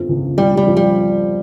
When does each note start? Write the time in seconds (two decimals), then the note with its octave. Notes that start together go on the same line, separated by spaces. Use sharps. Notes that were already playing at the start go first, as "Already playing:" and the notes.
Already playing: G1 F2 F3
0.09 C#2
0.38 C#2 G3
0.57 G3
0.67 F3
0.77 G3